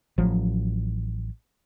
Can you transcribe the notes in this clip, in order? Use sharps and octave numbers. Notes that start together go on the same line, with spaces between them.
A1 F3 F#3